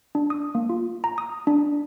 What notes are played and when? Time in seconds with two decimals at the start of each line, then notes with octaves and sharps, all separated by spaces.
0.15 D4
0.30 D#6
0.55 A#3
0.69 F4
1.04 A#5
1.18 D#6
1.47 D4